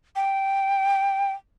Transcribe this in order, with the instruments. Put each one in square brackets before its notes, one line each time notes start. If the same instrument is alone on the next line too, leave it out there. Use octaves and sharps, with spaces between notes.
[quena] G5